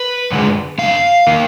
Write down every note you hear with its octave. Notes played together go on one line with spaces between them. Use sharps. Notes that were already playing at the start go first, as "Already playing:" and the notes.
Already playing: B4
F#2 D3 G#3
F#2 D3 G#3 F5
D#3 A#3